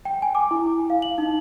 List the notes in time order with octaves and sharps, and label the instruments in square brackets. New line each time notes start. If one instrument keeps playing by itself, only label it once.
[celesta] G5
G#5
D6
E4
F5
F#7
D#4